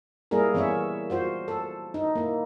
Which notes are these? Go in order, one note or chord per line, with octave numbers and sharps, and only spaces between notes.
G3 A#3 E4 G#4 A#4
E3 B3 C#4 C#5 E5
F4 F#4 C5
A4
D#4
A#3 E4